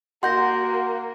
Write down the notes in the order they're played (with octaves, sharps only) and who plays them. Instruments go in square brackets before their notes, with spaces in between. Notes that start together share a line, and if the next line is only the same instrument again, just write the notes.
[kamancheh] A#3 [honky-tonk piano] F#4 [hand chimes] C6 G6 A#6